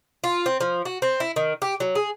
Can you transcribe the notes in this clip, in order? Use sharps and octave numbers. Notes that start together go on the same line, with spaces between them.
F4
C4
F3
F#4
C4
E4
D#3
G4
F#3
G#4